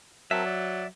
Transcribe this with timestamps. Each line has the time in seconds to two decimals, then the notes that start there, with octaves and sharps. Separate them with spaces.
0.31 F#3 C4 A#4 E5 A5
0.45 D5